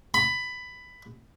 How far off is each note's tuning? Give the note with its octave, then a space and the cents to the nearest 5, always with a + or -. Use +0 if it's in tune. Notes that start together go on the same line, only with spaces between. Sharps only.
B5 +15